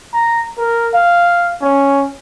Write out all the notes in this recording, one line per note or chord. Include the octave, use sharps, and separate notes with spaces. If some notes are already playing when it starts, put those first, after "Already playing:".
A#5
A#4
F5
C#4